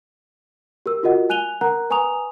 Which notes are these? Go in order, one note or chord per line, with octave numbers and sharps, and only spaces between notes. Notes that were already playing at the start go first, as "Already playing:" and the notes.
G4 A#4 E6
F4 F#4 A#4 D#5 F#5
G#5 F#6 D#7 F7 G7
A#4 F#5 A#5 F#6
B4 G#5 A#5 C#6 D#6 F7